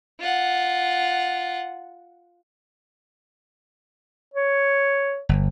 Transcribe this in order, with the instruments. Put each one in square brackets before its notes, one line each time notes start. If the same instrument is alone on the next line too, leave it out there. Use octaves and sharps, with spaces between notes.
[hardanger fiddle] F4 F#5
[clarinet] C#5
[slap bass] G1